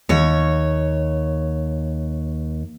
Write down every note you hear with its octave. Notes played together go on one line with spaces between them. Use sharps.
D#2 C#5